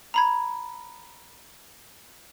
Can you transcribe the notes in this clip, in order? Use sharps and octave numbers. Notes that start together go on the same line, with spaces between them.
A#5 B5 G#6